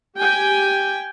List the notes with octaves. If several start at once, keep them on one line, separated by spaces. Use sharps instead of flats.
G4 G5 G#5